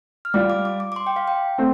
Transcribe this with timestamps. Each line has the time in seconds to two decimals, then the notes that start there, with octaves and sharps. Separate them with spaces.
0.25 F6
0.34 G3 F4 D6
0.50 D6
0.65 D6
0.80 D6
0.92 D6
0.96 C6
1.07 G5
1.16 F5
1.28 G5
1.58 A3 C4